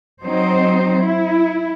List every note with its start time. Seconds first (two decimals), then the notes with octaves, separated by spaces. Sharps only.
0.24 F#3 C4 D#4 C5
1.00 E4